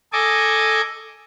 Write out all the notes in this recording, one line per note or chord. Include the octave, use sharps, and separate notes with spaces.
A4 D#5 G#5 D6